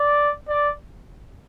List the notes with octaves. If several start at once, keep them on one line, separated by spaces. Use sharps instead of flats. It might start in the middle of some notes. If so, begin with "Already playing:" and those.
Already playing: D5
D5